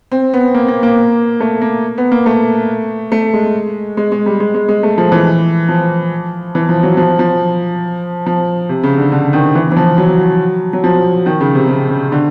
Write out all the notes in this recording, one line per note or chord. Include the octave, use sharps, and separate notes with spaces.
C4
B3
A#3
A#3
A#3
A3
A#3
B3
A#3
A3
A3
G#3
G#3
G#3
G3
G#3
G#3
G#3
A3
F3
E3
F3
E3
F3
F#3
F3
F3
F3
C3
C#3
D3
D3
D#3
E3
E3
F3
F#3
F#3
F3
D#3
C#3
C3
C#3
C#3
D3